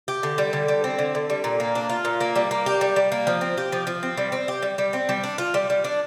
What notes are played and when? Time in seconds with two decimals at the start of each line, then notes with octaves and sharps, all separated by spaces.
0.08 G4
0.23 D3
0.38 G3
0.53 D3
0.68 G3
0.84 C4
0.99 D3
1.15 D3
1.30 G3
1.44 A#2
1.60 A#3
1.75 D4
1.89 F4
2.05 A#2
2.20 A#3
2.35 G3
2.51 A#3
2.66 G4
2.81 G3
2.96 G3
3.12 A#3
3.27 F3
3.41 C4
3.57 G4
3.72 F3
3.87 F3
4.03 C4
4.17 G3
4.32 C4
4.48 G4
4.62 G3
4.78 G3
4.93 C4
5.09 G3
5.24 D4
5.38 F4
5.54 G3
5.70 G3
5.84 D4